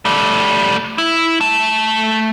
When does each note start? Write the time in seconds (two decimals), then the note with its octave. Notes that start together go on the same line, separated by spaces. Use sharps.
0.05 G3 A3
0.98 E4
1.41 A3 A5